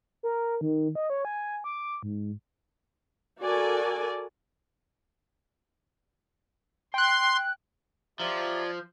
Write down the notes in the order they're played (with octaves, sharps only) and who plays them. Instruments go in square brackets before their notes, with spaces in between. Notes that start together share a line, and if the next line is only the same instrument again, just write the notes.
[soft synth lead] A#4
D#3
D#5
C#5
G#5
D6
G#2
[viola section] F#4 A4 A#4 D5 G#5
[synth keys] G5 F#6 [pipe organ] C6
[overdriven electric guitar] F3 [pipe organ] F4 D5 G#6 [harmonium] G4 E5 A#5